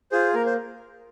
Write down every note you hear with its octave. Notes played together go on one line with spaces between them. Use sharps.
F4 G#4 C5
A#3 A#4
C5